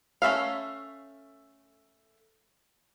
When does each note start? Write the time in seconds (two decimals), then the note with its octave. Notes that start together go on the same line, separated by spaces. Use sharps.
0.22 A3 C#4 E5 F5